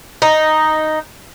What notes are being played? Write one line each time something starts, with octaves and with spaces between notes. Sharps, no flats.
D#4